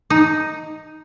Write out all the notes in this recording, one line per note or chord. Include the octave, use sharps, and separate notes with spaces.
D#4